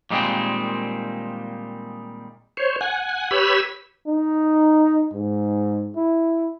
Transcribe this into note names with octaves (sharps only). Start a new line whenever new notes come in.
A#2 D#3 G3 G#3 A#3 C4
C5 C#5
F#5 G#5
G4 B4 C#5 B5 E6
D#4
G#2
E4